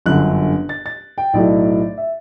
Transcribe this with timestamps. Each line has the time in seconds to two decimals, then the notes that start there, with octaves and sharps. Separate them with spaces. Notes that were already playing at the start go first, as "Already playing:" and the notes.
0.06 G1 F#2 D3 F#6
0.69 A6
0.86 A6
1.18 G5
1.33 B1 A2 F#3 A3 D5
1.97 E5